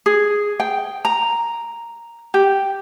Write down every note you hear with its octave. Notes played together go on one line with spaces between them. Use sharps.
G#4
G5
A#5
G4